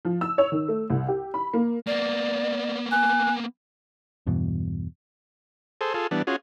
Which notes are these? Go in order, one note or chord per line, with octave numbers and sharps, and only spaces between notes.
F3
E6
C#5
D#3
A3
C2
G4
B5
A#3
A#3 B3 D5
G#5 F#6
E2 G2 B2 E3
G#4 A4 C5
F4 G#4 A4
E3 G3 B3 D4
C#4 F4 F#4 G#4